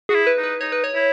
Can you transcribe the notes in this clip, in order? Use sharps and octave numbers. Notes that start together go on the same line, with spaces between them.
F#4 G#4
E4
B4
D#4
B4
D#4 C#5
B4
C#5
E4